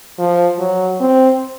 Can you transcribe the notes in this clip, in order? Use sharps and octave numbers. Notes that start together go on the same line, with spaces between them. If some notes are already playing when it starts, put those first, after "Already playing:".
F3
F#3
C4